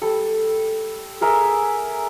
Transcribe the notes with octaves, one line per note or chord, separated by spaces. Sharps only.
G3 A4
G#4 A#4 E5